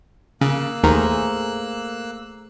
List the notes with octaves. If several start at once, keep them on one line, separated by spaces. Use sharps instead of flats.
C#3 A#3 E6 F#6
D#2 D#3 A3 G#4 C5 A#5